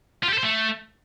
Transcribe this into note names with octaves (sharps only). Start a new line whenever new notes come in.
F4
G4
A4
C5
A3